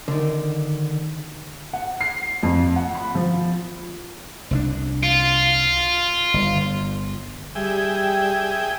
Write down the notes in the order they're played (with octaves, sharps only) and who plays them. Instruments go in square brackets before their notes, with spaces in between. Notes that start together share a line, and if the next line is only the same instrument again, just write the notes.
[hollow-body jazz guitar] D3 D#3
[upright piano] F#5
C7
F2
F#5
B5
F3
[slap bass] C2 G#3 D4
[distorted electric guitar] F4
[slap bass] G1
[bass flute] G3 [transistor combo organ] G#4 E5 G5